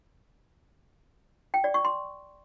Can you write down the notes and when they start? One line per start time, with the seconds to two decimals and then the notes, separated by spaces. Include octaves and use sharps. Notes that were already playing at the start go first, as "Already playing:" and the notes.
1.54 G5
1.64 D5
1.74 C#6
1.85 C6